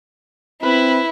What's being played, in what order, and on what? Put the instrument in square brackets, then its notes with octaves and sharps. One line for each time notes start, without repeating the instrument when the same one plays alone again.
[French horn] C4 [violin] E4 [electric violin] B4